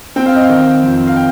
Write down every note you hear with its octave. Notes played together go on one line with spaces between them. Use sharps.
C4 G5
F5
D#5
F5
D#3
F2
F5
G5